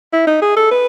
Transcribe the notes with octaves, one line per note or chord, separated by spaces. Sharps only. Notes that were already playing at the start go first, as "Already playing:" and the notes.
E4
D#4
G#4
A4
B4